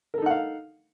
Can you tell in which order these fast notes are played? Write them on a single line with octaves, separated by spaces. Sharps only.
A#4 A4 D#4 F#5 F5